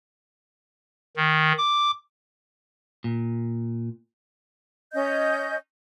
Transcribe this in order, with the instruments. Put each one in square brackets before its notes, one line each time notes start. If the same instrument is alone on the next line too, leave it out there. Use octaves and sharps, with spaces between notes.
[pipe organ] D#3
D6
[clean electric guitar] A#2
[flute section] C#4 D#5 G6